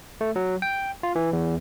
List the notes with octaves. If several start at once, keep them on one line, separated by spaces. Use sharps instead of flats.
A3
F#3
G5
F4
E3
E2